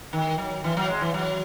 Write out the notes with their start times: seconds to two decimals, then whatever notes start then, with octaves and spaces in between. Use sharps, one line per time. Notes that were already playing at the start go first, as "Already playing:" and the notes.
0.13 D#3
0.38 F#3
0.64 E3
0.77 F#3
0.89 G#3
1.01 E3
1.14 F#3